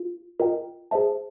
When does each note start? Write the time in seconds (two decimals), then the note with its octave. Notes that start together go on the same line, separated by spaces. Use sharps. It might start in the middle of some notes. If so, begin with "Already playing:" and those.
Already playing: F4
0.40 F4 A#4 D#5 G5
0.91 G#4 C5 E5 A5